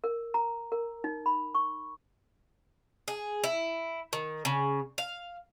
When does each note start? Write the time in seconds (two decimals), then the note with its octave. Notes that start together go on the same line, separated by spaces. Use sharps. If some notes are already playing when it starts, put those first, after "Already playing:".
0.04 A#4
0.34 A#5
0.72 A#4
1.04 D#4
1.26 B5
1.55 C#6
3.08 G#4
3.44 E4
4.13 D#3
4.45 C#3
4.98 F5